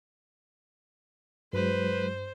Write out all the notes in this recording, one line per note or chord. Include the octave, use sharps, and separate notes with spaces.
G2 F#3 G#3 B4 C5